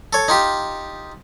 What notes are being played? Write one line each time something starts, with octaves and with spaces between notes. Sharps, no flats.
A4 C#5
D#4 F4 G4